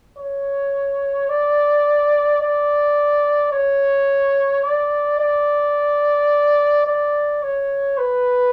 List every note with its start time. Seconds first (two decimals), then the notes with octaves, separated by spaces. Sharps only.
0.18 C#5
1.29 D5
2.41 D5
3.52 C#5
4.63 D5
5.19 D5
6.86 D5
7.43 C#5
7.98 B4